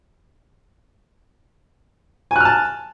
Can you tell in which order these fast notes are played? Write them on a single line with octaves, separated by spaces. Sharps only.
G#5 F#6 F6 A5